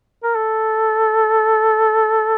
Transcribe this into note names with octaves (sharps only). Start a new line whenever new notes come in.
A#4
A4